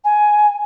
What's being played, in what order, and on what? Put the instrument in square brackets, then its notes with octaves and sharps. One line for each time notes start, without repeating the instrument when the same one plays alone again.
[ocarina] G#5